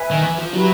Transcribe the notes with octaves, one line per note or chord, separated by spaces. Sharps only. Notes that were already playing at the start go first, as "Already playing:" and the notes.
Already playing: B4 E5 G#5
D#3
E3
F3
F#3 E4 G4 B4